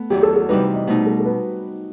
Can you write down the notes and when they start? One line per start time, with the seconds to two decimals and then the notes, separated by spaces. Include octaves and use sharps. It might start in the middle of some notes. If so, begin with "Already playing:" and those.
Already playing: A3 B3
0.10 E2 D#3 F#3 G4
0.23 A4
0.36 A4
0.49 C3 E3 G3 D#4 B4
0.62 C5
0.74 D#5
0.87 B2 A3 D#4 C5
1.06 A4
1.20 A4
1.26 B4